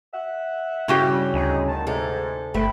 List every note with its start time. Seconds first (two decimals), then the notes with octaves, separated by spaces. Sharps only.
0.14 E5 F#5
0.88 G2 C#3 G3 C#4 E4 F#4 G4
1.34 D2 D#4 G#4
1.68 D#3 A5
1.87 G#2 C3 A4
2.54 G1 A3 G5 B5